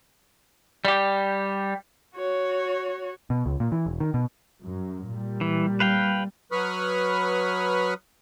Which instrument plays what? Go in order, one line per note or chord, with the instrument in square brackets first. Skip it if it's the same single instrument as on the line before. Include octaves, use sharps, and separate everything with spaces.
[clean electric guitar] G3 G4
[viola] F#4 C#5
[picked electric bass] B2
C#2
A#2
E3
E1
D#3
B2
[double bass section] F#2
A#2 G3
[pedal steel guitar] E3
B4 F5 G5
[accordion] F#3 B4 B5 C#6 D#6 F6